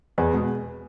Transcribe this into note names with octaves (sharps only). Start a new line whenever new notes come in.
E2 G#4 B4
B2 G#3